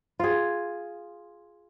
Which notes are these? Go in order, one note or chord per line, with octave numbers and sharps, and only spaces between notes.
F4 G#4